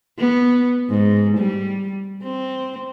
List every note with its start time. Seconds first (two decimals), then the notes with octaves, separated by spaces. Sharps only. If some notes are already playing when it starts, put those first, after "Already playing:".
0.18 B3
0.89 G#2
1.37 G3
2.22 C4